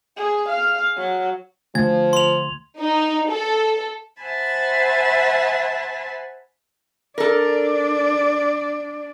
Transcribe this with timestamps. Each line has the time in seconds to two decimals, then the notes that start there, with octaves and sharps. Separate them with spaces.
0.17 G#4
0.49 F5
0.97 F#3
1.75 D2 D3 F3 A3 G#6
2.13 C6 F7
2.79 D#4
3.31 A4
4.23 C5 E5 F#5 G#5 A5 B5
7.18 D4 A4 A#4 D5